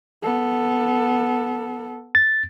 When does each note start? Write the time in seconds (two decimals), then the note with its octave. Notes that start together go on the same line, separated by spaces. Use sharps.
0.23 B3 A4
2.15 A6